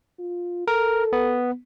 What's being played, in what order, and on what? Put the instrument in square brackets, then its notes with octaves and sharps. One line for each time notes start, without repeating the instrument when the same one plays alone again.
[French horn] F4
[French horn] A4 [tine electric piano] A#4
[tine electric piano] B3